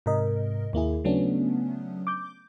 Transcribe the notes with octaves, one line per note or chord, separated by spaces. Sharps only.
G#2 C3 A#4 D#5
D#2 A#3 E4 G#4
C#3 F#3 A3 B3 C#4 D4
D6 G6